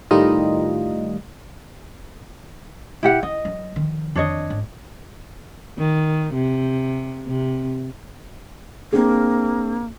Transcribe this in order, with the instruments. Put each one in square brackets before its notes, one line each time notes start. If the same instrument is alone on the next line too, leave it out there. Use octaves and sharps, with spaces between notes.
[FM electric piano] A2 D#3 G3 D#4 F4 D#5
[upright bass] B2 [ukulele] E4 G4 F#5
[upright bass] E4 [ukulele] D#5
[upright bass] F#3
D#3 F3
[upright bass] F2 D#3 [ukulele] D4 C#5 D#5
[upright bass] G#2
[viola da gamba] D#3
C3
C3
[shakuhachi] A#3 [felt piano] C4 D4 G#4